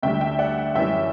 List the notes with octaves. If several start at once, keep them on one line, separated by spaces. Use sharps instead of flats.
D2 D3 G3 E5 G5
E5 G5
D5 F#5
F#2 E3 G3 E5 G5